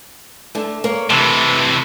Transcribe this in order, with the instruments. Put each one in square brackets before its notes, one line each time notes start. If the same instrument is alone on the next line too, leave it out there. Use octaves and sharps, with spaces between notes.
[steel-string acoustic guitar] D3 A3
A#3 C#5
[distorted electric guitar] C3 E3 [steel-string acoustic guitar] A3